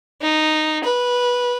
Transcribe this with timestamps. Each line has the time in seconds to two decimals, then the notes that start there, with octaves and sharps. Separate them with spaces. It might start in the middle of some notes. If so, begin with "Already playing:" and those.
0.22 D#4
0.84 B4